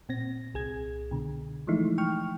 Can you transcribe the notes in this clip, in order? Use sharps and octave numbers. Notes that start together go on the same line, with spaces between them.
A#2 C4 A#6
C2 G#4 G#6
B2 D3
E3 F3 G#3 A3 D#4 E4
G5 C#6 F6